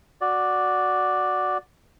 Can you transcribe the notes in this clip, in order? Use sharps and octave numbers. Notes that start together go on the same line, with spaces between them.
F#4 D5